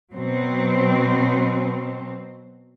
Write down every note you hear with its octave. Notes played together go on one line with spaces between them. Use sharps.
B2 F#3 C4